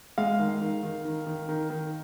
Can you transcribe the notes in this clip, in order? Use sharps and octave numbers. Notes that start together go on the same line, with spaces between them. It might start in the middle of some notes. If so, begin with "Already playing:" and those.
G#3 F5
D#3
D#3
D#3
D#3
D#3
D#3
D#3